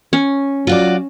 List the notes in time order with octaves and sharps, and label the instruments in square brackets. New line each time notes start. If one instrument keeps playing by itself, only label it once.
[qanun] C#4
[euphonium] F#3 [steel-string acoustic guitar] F4 F#4 D5